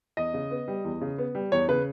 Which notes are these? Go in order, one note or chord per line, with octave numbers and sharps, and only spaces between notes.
E2 D#5
C#3
B3
G3
E2
C#3
B3
G3
E2 C#5
C#3 B4